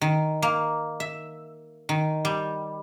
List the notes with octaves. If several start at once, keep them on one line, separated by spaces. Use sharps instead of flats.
D#3
A#3
E5
D#3
G3